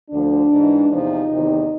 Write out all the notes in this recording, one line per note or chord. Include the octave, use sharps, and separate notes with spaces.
D2 D3 F3 D4
G#2 E3
E2 C3 F3 D#4
E2 C3 D#3